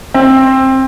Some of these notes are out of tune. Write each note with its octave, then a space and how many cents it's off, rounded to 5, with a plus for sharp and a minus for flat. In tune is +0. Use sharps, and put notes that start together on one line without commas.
C4 +15